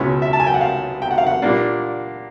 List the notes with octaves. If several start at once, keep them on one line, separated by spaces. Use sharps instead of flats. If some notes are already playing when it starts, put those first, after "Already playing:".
Already playing: C#2 B2 G#3 C#4 E4 E5
E5
A5
G#5
G5
F#5
F5
G5
F#5
F5
F#5
A#2 G3 A#3 D4